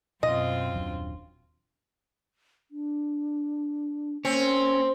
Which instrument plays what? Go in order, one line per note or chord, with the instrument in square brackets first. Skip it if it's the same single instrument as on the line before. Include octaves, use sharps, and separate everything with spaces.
[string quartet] F#2 C4 F4 [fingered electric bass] B2 [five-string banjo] D#5
[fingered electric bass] D#1 F#3 D4
[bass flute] D4
[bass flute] A#3 [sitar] C4 [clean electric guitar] C#4